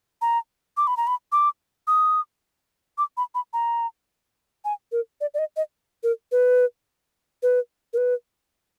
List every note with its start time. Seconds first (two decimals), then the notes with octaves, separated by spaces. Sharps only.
0.22 A#5
0.77 D6
0.87 B5
0.97 A#5
1.07 B5
1.32 D6
1.87 D#6
2.98 D6
3.17 B5
3.35 B5
3.53 A#5
4.65 G#5
4.92 A#4
5.21 D5
5.34 D5
5.39 D#5
5.57 D#5
6.03 A#4
6.32 B4
7.43 B4
7.93 A#4
7.97 B4